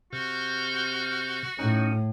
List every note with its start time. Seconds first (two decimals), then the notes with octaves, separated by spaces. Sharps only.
0.13 C3 F#4 F6 G6
1.59 A2 C#4 D#4